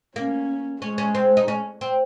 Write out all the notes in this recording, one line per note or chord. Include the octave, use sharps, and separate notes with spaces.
A#3 C#4
G#3 C#4
C#4
C4
D#4
C#4
C4